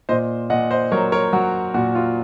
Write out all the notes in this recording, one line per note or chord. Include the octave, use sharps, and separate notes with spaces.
A#2 C5 D#5
A#2 D#5 F#5
C5 D#5
F#3 A#4 C#5
A#4 C#5
F#3 F#4
A#2 F#4
F4